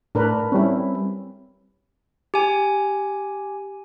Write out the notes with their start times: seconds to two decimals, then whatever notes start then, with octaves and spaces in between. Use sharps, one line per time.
0.15 A2 D4 A#4 B4
0.52 G3 C4 C#4 E4
2.34 G4 G#5